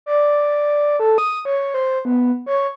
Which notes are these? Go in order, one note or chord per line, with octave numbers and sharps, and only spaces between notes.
D5
A4
D#6
C#5
C5
B3
C#5